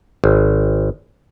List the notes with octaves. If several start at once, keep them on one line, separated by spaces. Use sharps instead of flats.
G#1